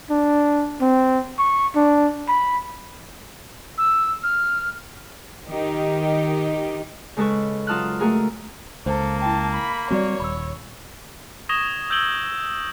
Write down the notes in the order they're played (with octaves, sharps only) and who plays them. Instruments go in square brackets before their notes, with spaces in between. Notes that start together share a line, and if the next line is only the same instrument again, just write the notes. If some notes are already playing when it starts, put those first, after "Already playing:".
[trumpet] D4
C4
C#6
D4
B5
[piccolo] E6
F6
[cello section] D#3 D#4 G4
[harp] C#3 G#3 A4 B4 C#6
F#3 F4 A5 D#6 F6 F#6
A3 F#4 G#4 A#4
[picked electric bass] C#2 [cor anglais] A#3 [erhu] A4 [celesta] C5
[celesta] E4 G5 [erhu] A5
[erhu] B5
[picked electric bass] G3 C4 [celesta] F#4 D5 [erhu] C#5
[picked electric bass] D#1 [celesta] B5 E6
[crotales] C#6 D#6 G#6 A#6 E7 G7
E6 G6 G#6 D7 F#7 G7